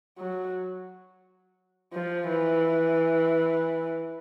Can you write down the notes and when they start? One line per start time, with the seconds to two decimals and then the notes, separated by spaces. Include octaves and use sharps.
0.18 F#3
1.94 F3
2.29 E3